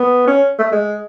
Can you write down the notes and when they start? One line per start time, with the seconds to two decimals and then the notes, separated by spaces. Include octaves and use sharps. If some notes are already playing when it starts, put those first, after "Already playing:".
Already playing: B3
0.27 C#4
0.59 A3
0.73 G#3